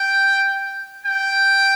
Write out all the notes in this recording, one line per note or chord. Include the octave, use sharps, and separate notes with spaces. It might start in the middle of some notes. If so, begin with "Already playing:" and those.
Already playing: G5
G5